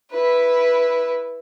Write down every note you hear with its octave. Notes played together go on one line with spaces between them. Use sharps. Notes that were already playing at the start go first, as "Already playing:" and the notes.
E4 B4